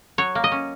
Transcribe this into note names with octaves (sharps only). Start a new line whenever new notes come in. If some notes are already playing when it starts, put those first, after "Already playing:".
F#3 C#5
A#3
D#5
C#4